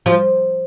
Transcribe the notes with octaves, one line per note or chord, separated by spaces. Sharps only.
F3